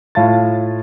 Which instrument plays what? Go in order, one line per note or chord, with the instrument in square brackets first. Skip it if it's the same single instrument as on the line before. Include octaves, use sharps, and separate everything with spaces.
[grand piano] A2 F4 A5 A6